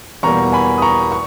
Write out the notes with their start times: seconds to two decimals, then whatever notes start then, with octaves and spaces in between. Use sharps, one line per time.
0.23 E2 B2 G3 A#3 A#5 C#6
0.53 G#5 B5
0.78 D#6
0.82 A#5 C#6
1.12 C#6